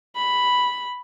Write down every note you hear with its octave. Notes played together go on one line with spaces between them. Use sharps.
B5